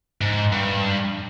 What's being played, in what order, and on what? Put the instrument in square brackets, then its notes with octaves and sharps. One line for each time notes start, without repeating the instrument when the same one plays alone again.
[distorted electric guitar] G#2
G2